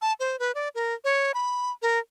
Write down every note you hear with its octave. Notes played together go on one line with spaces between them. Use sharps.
A5
C5
B4
D5
A#4
C#5
B5
A#4